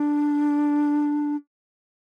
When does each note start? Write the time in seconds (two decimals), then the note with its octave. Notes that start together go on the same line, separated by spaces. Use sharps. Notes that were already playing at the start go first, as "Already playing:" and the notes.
Already playing: D4